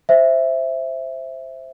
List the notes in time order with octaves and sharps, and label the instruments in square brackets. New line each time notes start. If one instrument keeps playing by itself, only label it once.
[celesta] C5 E5